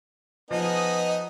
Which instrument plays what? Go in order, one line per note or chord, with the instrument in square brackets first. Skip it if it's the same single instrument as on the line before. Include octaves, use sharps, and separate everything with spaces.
[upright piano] F3 [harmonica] B3 D#4 [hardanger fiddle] G#4 D#5